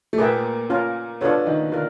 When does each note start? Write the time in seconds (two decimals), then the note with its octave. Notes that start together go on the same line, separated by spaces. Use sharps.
0.13 A3
0.18 A#2 A#3 G#4 B4 E5 G5
0.70 C#4 F4 A#4
1.21 B2 B3 D4 F4 A4 C#5
1.46 D#3 D#4
1.72 D3 D4 F4 A#4